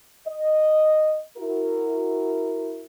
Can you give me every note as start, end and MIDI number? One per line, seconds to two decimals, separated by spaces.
0.27 1.21 75
1.37 2.85 64
1.37 2.85 66
1.37 2.85 70